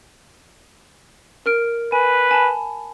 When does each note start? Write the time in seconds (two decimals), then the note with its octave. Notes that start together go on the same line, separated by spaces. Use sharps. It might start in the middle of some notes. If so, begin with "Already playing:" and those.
1.46 A#4 F6 D7
1.92 B4 G#5
2.31 G#5 A5 B5